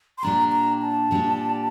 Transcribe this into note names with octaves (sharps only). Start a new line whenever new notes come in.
C6
A#2 G3 D4 G4 A#5
A#5
A5
A#2 G3 D4 G4